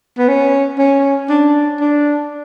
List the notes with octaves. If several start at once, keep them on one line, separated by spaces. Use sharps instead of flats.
B3
C#4
C#4
D4
D4